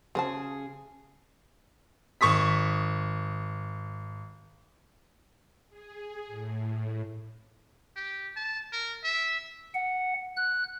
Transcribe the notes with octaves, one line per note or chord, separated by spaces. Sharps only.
C#3 F#3 G#4 C5 A5
G#1 C#6 D#6 B6
G#4
A2
G4
A5
A#4
E5
F#5
F#6